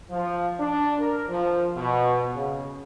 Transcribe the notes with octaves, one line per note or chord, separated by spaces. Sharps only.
F3
D4
A#4
F3
B2
C#3